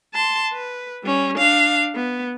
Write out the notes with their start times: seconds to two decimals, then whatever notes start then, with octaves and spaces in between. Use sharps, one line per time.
0.14 A5 C6
0.53 B4
1.04 G3 C#4
1.38 D4 F5
1.95 B3